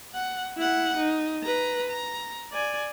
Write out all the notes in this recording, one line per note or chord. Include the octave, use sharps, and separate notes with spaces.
F#5
E4 F#5
D#4
B4 A#5
A#5
D5 G#5